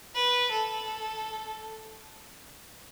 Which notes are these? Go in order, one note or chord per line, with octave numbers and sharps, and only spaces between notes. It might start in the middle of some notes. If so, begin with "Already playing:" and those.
B4
A4